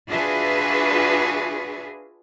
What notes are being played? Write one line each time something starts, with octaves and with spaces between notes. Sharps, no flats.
D4 F4 F#4 G#4 B4 E5